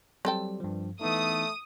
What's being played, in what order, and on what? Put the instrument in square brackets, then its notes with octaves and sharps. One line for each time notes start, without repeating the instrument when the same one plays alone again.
[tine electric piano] F#3 G3 G4 [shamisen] C4 A4 G5
[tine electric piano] G2 F3
[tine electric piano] E3 B3 D#4 [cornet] A3 [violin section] D#6